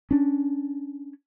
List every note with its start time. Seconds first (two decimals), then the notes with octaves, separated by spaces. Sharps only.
0.11 C#4 D4